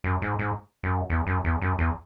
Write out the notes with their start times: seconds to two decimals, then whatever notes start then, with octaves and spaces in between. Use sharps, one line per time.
0.04 F#2
0.22 G#2
0.39 G#2
0.83 F#2
1.10 E2
1.27 F#2
1.44 E2
1.61 F#2
1.79 E2